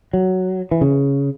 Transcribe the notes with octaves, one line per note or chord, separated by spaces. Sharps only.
F#3
E3
C#3